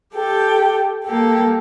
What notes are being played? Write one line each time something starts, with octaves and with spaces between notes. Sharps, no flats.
G4 A4 G5
A#3 G4 A4